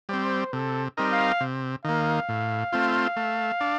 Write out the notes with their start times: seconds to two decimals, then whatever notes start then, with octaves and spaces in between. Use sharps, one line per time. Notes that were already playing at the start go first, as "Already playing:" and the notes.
0.09 G3 C4 C5
0.53 C3 A4
0.97 G3 C4 D#4 A#4
1.12 F5
1.41 C3
1.84 D#3 A#3 F5
2.29 A2
2.73 A3 C4 F4
3.17 A3
3.60 D4